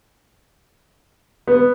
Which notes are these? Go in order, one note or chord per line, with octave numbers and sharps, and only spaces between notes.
B3